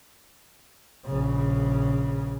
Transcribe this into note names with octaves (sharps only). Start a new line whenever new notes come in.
A#1 C#3